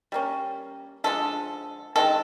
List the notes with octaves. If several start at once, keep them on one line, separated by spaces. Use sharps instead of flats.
G3 A#3 C#4
D3 F3 G#3 A4
D#3 G#3 C4 A4